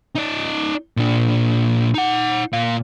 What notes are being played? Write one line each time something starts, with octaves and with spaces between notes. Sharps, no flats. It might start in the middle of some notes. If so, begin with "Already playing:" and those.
D#4 D5
A#2 D4
D#4 F#5
A#2 F5